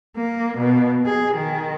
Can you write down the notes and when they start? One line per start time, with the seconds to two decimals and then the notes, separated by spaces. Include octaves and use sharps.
0.17 A#3
0.58 B2
1.06 G#4
1.35 D#3